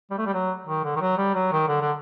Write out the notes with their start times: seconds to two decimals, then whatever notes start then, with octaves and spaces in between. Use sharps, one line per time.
0.11 G3
0.18 A3
0.26 G3
0.34 F#3
0.66 D#3
0.84 D3
0.96 D#3
1.01 F#3
1.17 G3
1.34 F#3
1.52 D#3
1.68 D3
1.81 D3